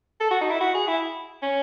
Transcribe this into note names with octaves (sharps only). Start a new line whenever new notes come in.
A4
F#4
D#4
E4
F#4
G#4
E4
C#4